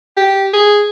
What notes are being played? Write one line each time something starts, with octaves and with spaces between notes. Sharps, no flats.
G4
G#4